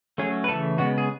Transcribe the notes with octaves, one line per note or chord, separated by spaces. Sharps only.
F#3 A3 C#4 G#4
B4
C#3 E3 A3 A4
C#3 G#3 B3 F#4
G#4